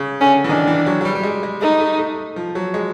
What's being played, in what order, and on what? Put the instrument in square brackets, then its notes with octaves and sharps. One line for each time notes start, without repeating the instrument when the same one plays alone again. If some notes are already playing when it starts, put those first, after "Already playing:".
Already playing: [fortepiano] C#3
[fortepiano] D3 [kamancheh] C#4
[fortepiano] E3
[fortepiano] D#3 [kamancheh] D4
[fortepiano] E3
F#3
F#3
G3
G3
G#3
G#3
[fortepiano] A3 [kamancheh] D#4
[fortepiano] A3
A3
F3
F#3
G#3